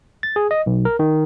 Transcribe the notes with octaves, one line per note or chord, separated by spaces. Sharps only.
A6
G#4
D#5
B1
A#4
D#3